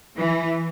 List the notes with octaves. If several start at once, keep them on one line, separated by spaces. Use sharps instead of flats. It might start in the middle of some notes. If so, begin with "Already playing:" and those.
E3